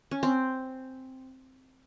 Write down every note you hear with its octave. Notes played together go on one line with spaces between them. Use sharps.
C#4
C4